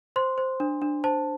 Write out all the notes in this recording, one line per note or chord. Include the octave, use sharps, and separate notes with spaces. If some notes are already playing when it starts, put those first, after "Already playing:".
C5 C6
C5
D4
D4
C5 A5